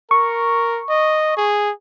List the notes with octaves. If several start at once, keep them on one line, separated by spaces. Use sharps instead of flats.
A#4 C#6
D#5
G#4